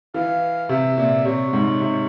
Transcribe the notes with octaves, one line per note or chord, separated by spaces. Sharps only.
E3 F5
C3 E5
A#2 E5
C3 C#5
G#2
C3